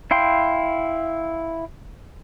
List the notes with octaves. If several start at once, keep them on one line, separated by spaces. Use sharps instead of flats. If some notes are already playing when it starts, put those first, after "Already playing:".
E4 F5 G5 C6